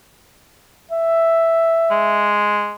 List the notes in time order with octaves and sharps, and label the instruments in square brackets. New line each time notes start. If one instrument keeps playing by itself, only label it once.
[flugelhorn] E5
[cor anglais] G#3